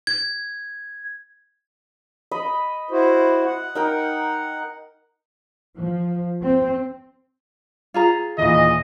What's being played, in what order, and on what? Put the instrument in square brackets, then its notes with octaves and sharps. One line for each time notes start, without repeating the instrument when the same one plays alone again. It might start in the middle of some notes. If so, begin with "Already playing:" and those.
[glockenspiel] G#6
[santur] D#5 B5
[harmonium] E4 F#4 C5
F#5
[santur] D#4 A#4 G5
[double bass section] F3
C4
[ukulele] F4 G#4 A#5
[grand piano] D#2 A#2 E3 [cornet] D#5